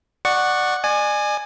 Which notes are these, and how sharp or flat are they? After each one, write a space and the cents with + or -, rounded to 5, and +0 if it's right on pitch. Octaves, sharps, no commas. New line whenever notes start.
D5 +20 F#5 +0 C#6 +0
D5 +40 G#5 +0